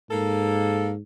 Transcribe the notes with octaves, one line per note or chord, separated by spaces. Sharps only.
G#2 A#3 A4